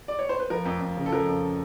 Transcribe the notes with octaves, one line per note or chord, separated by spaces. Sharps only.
D5
C#5
C5
B4
F3 A#4
F2
F2
C#3
A4
F3 A#4
F2